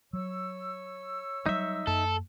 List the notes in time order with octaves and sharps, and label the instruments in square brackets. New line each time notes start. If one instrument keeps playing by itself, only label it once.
[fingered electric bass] F#3 [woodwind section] C#5 C#6 E6
[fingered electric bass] F#3 G3 [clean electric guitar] D#4 E5
[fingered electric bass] F#2 A#3 [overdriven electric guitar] A4